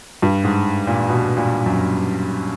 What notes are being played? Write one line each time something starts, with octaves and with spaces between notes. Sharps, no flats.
G2
G#2
A#2
B2
A#2
F#2